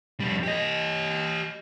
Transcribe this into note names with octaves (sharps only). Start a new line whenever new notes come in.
F2 G3
G4 D#5